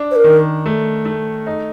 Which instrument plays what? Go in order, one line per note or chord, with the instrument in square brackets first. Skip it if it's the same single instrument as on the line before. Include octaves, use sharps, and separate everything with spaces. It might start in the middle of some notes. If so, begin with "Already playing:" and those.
Already playing: [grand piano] D4
[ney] C5
A#4
[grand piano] D#3
A3
A3
D#4